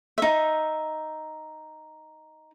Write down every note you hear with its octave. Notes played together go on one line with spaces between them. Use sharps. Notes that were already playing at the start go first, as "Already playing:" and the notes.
D#4 E5